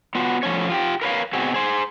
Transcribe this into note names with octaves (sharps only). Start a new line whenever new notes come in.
B3 F4 F#4
F3 A3 C#4 C#5
F4 G4 G5
A#4 B4 C#5 F5
B2 C4 F#4 G#4
G#4 C5